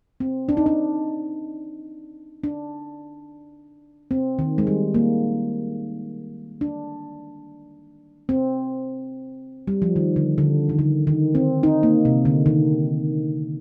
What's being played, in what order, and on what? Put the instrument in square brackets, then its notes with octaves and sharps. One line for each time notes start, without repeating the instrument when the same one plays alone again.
[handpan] C4
D4
D#4
D4
D4
C4
D#3
G#3
G3
A#3
D4
C4
G3
F3
D#3
D3
D3
D#3
D3
D#3
C4
D#4
A#3
C3
D3
D#3